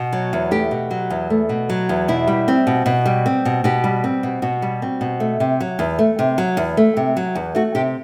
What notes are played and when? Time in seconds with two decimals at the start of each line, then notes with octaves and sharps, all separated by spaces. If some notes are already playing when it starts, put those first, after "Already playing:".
Already playing: B2
0.13 F#3
0.33 E2
0.51 A3 G4
0.71 B2
0.91 F#3
1.10 E2
1.30 A3
1.49 B2
1.69 F#3
1.89 E2
2.08 B2 E4
2.27 G3
2.48 C4
2.67 B2
2.86 B2
3.06 G3
3.26 C4
3.45 B2
3.64 B2 G4
3.84 G3
4.04 C4
4.23 B2
4.42 B2 F#4
4.62 G3
4.82 C4
5.01 B2
5.20 A3
5.40 C3
5.60 F#3
5.79 E2
5.99 A3
6.19 C3
6.38 F#3
6.57 E2
6.77 A3
6.97 C3
7.17 F#3
7.35 E2
7.55 A3 F#4
7.75 C3 G4